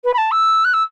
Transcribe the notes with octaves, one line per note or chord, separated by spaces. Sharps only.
B4
B5
A5
E6
F#6
E6